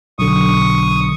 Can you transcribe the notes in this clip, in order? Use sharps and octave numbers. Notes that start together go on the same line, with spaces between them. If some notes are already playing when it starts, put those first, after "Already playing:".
B1 D3 C#6 D#6